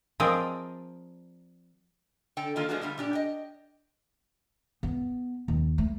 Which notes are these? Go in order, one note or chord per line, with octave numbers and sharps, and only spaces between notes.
F3 C4 G#4 A#4 D5 D#5
D3 A4 G5
D3 D#3 F3 A#3 F4
F3 G#3 A3 B3 D4 F#4
D3 G3 A3 F4
A#2 D4 G4
D#5 G5
B3
D#2
A3